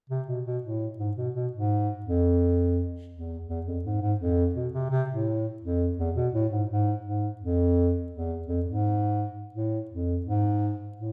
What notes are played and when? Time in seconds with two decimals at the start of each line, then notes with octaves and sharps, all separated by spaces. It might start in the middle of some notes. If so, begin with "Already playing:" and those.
0.09 C3
0.27 B2
0.45 B2
0.63 A2
0.98 G#2
1.17 B2
1.34 B2
1.52 G#2
2.05 F2
3.13 E2
3.48 E2
3.66 F2
3.84 G#2
4.01 G#2
4.19 F2
4.55 B2
4.73 C3
4.90 C3
5.09 A2
5.62 F2
5.98 E2
6.15 B2
6.33 A2
6.51 G#2
6.69 G#2
7.05 G#2
7.40 F2
8.12 E2
8.47 F2
8.65 G#2
9.54 A2
9.90 F2
10.26 G#2
10.97 A2